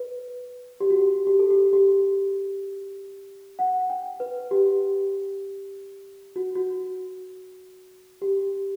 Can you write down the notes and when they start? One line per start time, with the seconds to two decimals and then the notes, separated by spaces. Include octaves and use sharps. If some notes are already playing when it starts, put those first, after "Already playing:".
Already playing: B4
0.80 G4
0.90 F#4
0.98 G4
1.27 G4
1.39 A4
1.50 G4
1.73 G4
3.59 F#5
3.90 G5
4.20 B4
4.51 G4
6.36 F#4
6.55 F#4
8.22 G4